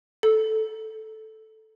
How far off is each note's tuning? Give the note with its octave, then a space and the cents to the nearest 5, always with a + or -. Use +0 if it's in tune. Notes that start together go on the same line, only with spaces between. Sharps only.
A4 -5